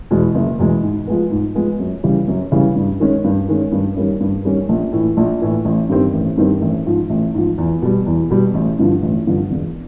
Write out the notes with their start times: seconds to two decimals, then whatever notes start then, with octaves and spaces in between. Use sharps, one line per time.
0.11 E2 B2 G#3
0.35 F#1
0.59 E2 B2 G#3
0.83 G#2
1.07 F3 G#3 B3
1.31 G#2
1.55 F3 G#3 B3
1.79 F#2
2.04 C#3 E3 G3
2.27 F#2
2.52 C#3 E3 G3
2.76 G2
3.00 D#3 G#3 C#4
3.24 G2
3.48 D#3 G#3 C#4
3.72 G2
3.96 D#3 G3 A#3 C#4
4.20 G2
4.45 D#3 G3 A#3 C#4
4.69 A#1
4.93 A2 E3
5.17 A#1
5.41 A2 E3
5.65 A1
5.89 G2 D#3 G3 C4
6.14 A1
6.37 G2 D#3 G3 C4
6.62 A1
6.86 G#2 F3
7.10 A1
7.34 G#2 F3
7.58 E2
7.82 B2 G3
8.06 E2
8.30 B2 G3
8.54 A1
8.79 G2 D3 F3
9.02 A1
9.27 G2 D3 F3
9.51 E1